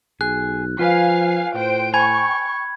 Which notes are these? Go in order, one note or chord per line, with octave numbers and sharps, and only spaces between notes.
B1 G#4 F#6
F3 F4 B4 F5 G#5 C7
A2 C5 G5 D7
G5 G#5 B5 C#6 G#6